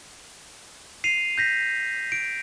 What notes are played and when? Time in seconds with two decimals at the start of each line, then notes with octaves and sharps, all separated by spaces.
1.04 C7 D#7 F7
1.38 G6 A#6 B6
2.12 D7